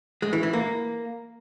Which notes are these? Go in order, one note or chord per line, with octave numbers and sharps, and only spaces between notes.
G#3
E3
E3
A#3